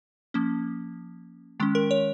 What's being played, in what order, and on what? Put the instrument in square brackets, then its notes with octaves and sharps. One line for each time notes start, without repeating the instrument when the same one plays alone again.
[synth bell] F3 A#3 C#4
D#3 G#3 C#4
A#4
C#5